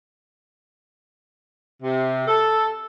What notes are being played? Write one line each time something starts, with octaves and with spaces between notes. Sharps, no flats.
C3
A4